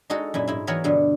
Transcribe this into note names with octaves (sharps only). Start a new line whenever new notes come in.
G#3 D#4 F#4 A4
F#2 A#2 E4
G#2 E4
E3 F#3 B3 E4 A#4 C#5
G2 B2 D3